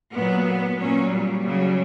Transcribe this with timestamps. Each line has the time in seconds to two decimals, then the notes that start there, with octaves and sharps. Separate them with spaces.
0.13 A#2 F#3 B3
0.78 A#2 F#3 C#4
1.10 G3
1.43 C#3 F#3